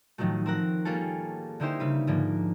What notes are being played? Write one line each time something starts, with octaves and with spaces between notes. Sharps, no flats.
A2 D#3 F3 F#3 A3
C4 A#4 F#5
G3 A#3 C#4 F4 G#4 A4
D3 A#3 D#4 E4 G4 C5
C#3 G3 B4
G#2 D3 F3 A#3